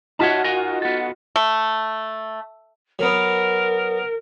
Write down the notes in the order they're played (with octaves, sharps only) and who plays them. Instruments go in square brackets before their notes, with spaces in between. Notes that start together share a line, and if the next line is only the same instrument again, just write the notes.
[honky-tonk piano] D#4 F4 F#4 [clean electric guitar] C#5 E5 A5
[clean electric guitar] A#4 G#5
B3 A4
[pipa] A3
[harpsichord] F#3 B3 [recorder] A#4